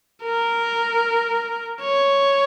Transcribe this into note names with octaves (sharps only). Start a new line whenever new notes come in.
A#4
C#5